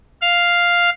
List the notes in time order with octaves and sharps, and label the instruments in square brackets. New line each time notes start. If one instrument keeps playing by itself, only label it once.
[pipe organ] F5